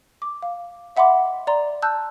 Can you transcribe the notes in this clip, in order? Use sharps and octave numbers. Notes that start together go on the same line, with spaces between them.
D6
F5
D#5 E5 F#5 B5 C6 D6
D5 A#5 C6
A5 E6 F#6 G6